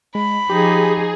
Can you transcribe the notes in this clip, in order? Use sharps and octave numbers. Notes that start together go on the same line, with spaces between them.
G#3 B5
F3 D#4 G4 G#4